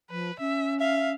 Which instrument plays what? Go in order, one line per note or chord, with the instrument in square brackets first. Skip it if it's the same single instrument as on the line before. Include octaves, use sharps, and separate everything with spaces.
[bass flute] F3 [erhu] B4
[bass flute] C#4 [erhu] E5
[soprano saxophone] E5 [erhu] F5